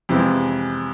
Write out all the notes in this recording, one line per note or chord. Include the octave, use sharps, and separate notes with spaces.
F2 C3 E3 G#3